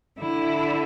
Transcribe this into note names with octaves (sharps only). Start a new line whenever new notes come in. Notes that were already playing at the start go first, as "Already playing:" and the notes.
D3 E4